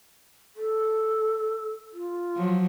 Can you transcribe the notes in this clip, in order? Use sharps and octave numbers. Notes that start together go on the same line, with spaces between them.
A4
F4
F3 F#3